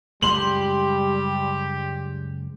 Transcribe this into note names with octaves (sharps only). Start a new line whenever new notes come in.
C#2 F#2 G3 G#3 G4 C6 F#7